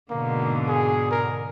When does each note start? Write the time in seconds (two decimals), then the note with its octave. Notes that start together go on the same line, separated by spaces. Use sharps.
0.10 G#2 B2 D3 A#3
0.68 G#4
1.11 A#4